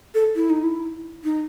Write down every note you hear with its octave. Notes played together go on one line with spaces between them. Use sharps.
A4
E4
D#4
E4
D#4